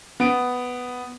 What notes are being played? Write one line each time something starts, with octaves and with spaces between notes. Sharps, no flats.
B3 D7